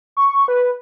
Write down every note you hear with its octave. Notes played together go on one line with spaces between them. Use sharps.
C#6
B4